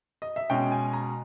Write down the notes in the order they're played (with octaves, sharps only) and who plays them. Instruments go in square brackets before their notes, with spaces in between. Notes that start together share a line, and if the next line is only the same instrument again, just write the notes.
[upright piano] D#5
E5
B2 G#3 C#4 G5
G#5
A#5